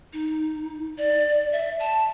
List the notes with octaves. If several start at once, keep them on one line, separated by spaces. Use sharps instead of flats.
D#4
D5
E5
A5